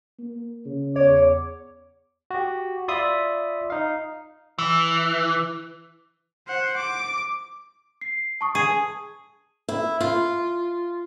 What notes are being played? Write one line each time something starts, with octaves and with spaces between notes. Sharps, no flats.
A#3
C#3
E2 C#5 D6
F#4 G4
F4 D5 E5 B5 C6 D#6
D#4 F5
E3
C5 F#5
D6
C7
A5 C#6 D#6
G#4
E4
F4